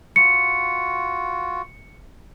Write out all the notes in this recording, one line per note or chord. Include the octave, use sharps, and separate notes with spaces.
F4 F#4 C#7